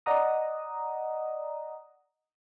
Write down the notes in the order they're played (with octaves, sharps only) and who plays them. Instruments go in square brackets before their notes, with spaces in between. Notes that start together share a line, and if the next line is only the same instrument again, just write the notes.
[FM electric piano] D5 D#5 F#5 A#5 D#6